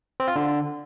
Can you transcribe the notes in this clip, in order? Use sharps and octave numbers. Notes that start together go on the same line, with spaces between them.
C4
F4
D3